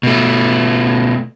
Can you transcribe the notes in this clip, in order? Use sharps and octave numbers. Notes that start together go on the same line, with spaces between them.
B2 A3